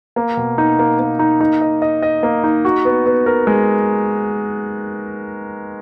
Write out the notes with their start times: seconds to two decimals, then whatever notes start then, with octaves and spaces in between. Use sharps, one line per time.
0.16 A#3
0.37 B2
0.58 D#4
0.79 A#3
0.99 A#3
1.19 D#4
1.41 D#4
1.61 D#5
1.82 D#5
2.02 D#5
2.23 A#3
2.44 D#4
2.65 F#4
2.85 B3
3.06 B3
3.26 A#4
3.47 G#3